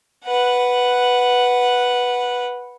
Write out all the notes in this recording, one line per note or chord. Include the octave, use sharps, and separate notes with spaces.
B4 F#5